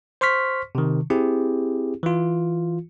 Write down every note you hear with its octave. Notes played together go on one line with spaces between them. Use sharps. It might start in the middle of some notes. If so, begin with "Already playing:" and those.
C5 C6 C#6 F6 B6
C3 D#3
C4 E4 G4 G#4
E3 F4